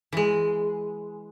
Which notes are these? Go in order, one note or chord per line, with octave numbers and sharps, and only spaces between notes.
E3 G#3